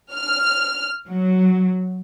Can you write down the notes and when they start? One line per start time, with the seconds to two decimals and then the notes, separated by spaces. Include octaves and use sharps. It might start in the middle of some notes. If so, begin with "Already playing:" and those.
0.14 F6
1.08 F#3